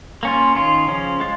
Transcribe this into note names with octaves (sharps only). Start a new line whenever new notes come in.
A#3 C#4 F4
D#3 C#4 F4
C#3 F3 C#4
G#3 F4